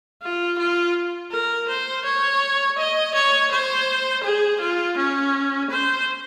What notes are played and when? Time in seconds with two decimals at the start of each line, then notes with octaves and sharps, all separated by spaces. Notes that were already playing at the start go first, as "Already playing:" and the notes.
0.22 F4
0.58 F4
1.31 A#4
1.68 C5
2.04 C#5
2.78 D#5
3.14 C#5
3.51 C5
4.23 G#4
4.60 F4
4.97 C#4
5.70 C5